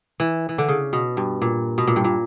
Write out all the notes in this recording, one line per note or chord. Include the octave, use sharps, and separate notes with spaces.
E3
E3
D3
C#3
B2
G2
A#2
B2
A#2
G2
A#2